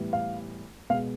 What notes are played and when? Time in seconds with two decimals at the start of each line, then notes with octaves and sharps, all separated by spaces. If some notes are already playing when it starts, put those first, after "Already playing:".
Already playing: A2 E3 G3 B3
0.13 F5
0.90 B2 G#3 B3 F5